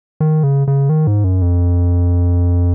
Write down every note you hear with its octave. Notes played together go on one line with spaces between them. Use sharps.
D#3
C#3
C#3
D#3
G#2
F#2
F2